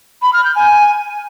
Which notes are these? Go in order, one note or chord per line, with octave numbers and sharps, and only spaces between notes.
B5
F6
G6
G#5